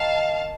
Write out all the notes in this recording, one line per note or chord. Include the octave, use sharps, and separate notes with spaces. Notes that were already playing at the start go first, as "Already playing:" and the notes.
Already playing: D#3 F5 A5